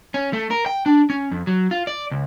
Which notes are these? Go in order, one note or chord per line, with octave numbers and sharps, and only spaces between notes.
C#4
A3
A#4
G5
D4
C#4
F2
F#3
F4
D5
C#2